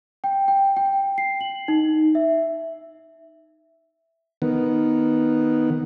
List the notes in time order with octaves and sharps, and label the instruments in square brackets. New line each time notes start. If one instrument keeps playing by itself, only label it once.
[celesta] G5
G5
G5
C7
F#7
D#4
E5
[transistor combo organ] D#3 B3